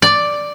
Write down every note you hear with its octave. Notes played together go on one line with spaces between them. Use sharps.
D5